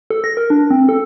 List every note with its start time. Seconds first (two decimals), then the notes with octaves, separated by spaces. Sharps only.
0.10 A4
0.24 A#6
0.37 A#4
0.50 D4
0.70 C4
0.89 A4